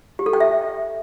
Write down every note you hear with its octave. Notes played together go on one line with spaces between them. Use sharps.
G4
A4
G5
E5